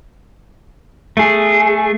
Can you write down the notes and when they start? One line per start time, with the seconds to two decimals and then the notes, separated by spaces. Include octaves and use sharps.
1.17 A3 G#4